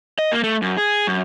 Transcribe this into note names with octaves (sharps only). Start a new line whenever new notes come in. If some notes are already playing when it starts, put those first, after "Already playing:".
D#5
A#3
A3
F#2
G#4
F#2